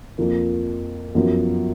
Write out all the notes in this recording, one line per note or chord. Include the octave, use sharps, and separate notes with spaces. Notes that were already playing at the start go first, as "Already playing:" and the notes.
F2 F3 A#3
F#2 F3 B3